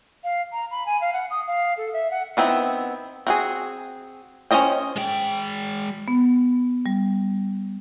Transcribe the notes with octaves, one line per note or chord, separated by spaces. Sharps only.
F5
A#5
B5
G#5
F5
F#5
D#6
F5
A4
E5
F#5
D#3 B3 C4 E4
C4 F#4 G#4
C#4 F4 C5 D#5 G5
G#3 G5
B3
G3